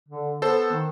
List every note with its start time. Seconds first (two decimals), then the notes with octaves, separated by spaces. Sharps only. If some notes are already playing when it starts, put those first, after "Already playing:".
0.09 D3
0.42 B3 A4 C5
0.72 D#3